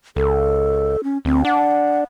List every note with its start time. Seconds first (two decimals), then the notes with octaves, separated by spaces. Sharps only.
0.16 C#2 A4
1.04 C#4
1.25 D2 C4
1.45 D4 F#5